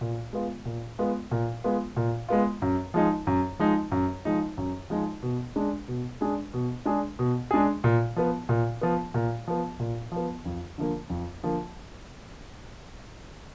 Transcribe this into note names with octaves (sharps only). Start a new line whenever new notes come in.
A#2
G#3 B3 F4
A#2
G#3 B3 F4
A#2
G#3 B3 F4
A#2
G#3 B3 F4
F#2
F3 G#3 D#4
F#2
F3 G#3 D#4
F#2
F3 G#3 D#4
F#2
F3 G#3 D#4
B2
G#3 D4 G#4
B2
G#3 D4 G#4
B2
G#3 D4 G#4
B2
G#3 D4 G#4
A#2
F3 B3
A#2
F3 B3
A#2
F3 B3
A#2
F3 B3
F2
D3 F3 A#3
F2
D3 F3 A#3